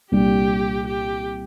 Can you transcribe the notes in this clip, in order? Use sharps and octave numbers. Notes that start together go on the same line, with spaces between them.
C2 A#2 G3 D4 G4
G4